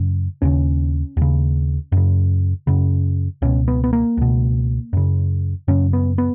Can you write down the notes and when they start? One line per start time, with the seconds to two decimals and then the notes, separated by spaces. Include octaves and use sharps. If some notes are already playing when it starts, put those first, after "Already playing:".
Already playing: F#2 C#3
0.42 D#2 C#3 C#4
1.17 D#2 C#3
1.92 F#2 C#3
2.67 F#2 C#3
3.42 C#2 B2 C#4
3.68 B3
3.84 B3
3.93 A#3
4.17 C#2 B2
4.93 F#2 C#3
5.68 F#2 C#3 C#4
5.93 B3
6.18 B3